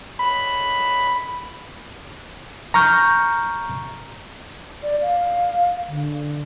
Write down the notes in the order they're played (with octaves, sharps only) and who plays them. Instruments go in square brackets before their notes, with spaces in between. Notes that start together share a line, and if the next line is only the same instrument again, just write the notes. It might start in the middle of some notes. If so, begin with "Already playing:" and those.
[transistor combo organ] B5
[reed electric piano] A#5 C#6 F6 G6
[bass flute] D5
F5
D3